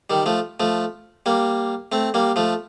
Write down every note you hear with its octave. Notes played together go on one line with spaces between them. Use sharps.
D#3 G3
F3 A3
F3 A3
G3 A#3
A3 C4
G3 A#3
F3 A3